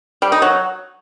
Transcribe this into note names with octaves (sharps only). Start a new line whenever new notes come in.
G3
D#4
F#3